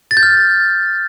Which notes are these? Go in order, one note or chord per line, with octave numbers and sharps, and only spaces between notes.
A6
G6
F6